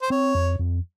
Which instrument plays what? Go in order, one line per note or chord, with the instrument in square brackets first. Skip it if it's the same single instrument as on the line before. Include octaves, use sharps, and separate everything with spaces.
[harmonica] C5
[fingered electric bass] C4 [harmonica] C#5
[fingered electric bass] F2
F2